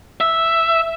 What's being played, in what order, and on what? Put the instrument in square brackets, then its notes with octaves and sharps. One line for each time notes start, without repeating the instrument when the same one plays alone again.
[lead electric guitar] E5